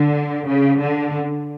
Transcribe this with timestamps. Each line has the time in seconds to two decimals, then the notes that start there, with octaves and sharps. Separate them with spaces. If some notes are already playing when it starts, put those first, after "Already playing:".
Already playing: D3
0.48 C#3
0.81 D3